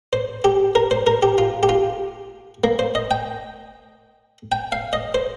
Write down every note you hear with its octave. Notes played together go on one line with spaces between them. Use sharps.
C5
G4
A#4
C5
A#4
G4
F4
G4
F4
A#3
C5
D#5
G5
G5
F5
D#5
C5